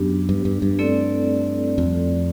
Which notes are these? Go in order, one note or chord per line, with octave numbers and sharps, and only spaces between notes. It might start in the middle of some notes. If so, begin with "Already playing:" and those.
Already playing: F#2 B3 D4 G4
G2
G2
G2
A3 C4 E4 A4 D5
F2